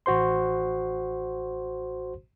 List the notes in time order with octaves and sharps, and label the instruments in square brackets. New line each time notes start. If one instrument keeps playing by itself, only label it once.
[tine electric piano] A1 F#4 C5 C6